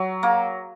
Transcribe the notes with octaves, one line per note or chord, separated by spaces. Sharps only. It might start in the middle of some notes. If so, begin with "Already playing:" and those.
Already playing: F#3
A#3